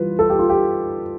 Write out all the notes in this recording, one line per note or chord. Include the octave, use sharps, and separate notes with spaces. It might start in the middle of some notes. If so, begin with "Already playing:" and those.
Already playing: E3 G3 F4 B4
A4
G4
F4
G4